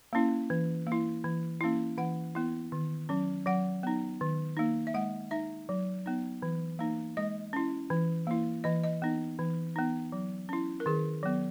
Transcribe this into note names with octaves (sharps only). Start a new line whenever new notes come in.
A#3 C#4 E4
E3
A#3
E4
E3
A#3 C#4 E4
E3 F#5
B3 E4
D#3
F#3 C#4
F#3 F#5
B3 D#4
D#3
A#3 D#4
E5
G#3 F#5
D#4 E5
F#3
B3 D#4
E3
A#3 D#4
G#3 D#5
C#4 E4
E3
A#3 E4
E3 D#5
D#5
B3 D#4
E3
B3 D#4
F#3
C#4 E4
A#4
D#3 G#4
F#3 B3